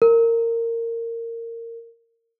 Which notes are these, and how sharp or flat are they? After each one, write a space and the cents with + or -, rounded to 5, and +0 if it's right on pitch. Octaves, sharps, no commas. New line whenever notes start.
A#4 -20